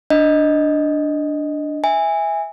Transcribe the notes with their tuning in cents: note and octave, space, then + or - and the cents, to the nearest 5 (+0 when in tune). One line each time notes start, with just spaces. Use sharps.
D4 +0 D#5 +0
E5 -10 G#5 -15